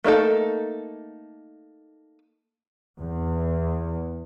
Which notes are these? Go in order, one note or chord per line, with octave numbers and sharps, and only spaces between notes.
A3 A#3 D#4 A4
E2